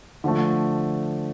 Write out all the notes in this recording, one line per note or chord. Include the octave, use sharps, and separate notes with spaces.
D3 F3 A3